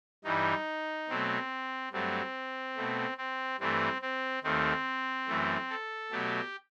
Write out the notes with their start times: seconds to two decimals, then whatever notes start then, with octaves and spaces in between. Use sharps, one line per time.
0.24 G2 E3 G3 D#4
1.09 B2 F#3 A3 C4
1.92 G2 F#3 A3 C4
2.77 B2 A3
3.17 C4
3.59 G2 E3 A3 C4
4.02 C4
4.43 D#2 D#3 A3 C4
5.28 F#2 E3 A3
5.70 A4
6.11 B2 F#3 A3 G4